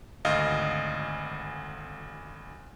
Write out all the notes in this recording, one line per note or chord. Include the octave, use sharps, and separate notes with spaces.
G#1 D2 D#5 F5